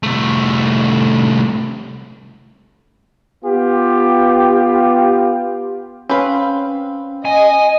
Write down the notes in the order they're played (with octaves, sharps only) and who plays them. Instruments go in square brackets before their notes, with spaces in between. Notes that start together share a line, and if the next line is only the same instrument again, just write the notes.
[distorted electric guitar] C2 A3
[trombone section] B3 F4 G4
[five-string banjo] C4 B4 [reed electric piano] C#4 F5
[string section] D#5 [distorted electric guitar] G#5